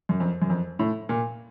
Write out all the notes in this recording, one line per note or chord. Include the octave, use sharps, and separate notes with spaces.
F#2
F2
F#2
F2
A2
A#2